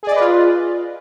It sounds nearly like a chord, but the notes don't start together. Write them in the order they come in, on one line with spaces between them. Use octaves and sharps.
G#4 D5 D#5 B4 F4